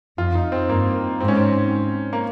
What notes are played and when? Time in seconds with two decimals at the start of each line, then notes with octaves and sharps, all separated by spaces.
0.18 F2 F4
0.35 D#4
0.52 C4
0.69 G2 A#3
1.20 G#2 C4
1.28 C#4
1.37 C4
2.13 A#3